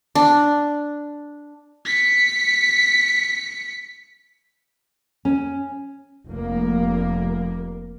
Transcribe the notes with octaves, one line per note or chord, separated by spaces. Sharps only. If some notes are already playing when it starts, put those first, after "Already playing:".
D4
B6 C#7
C#4
F1 A#3